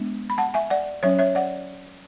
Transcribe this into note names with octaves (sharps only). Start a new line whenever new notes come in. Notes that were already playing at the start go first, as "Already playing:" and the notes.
Already playing: G#3 B3 D4
B5
F#5 A5
E5 G#5
D5 F#5
F#3 C#4 C#5 E5
C#5 E5
D5 F#5